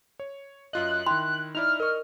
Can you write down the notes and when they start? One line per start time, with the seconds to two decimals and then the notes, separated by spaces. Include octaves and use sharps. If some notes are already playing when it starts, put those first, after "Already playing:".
0.20 C#5
0.73 F#2 F4 D#5 F#6
1.06 D#3 E4 G5 C6
1.55 D#4 E4 D5 F6
1.80 A#4 D5 D#5 C#6